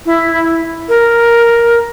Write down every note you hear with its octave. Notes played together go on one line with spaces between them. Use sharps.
E4
A#4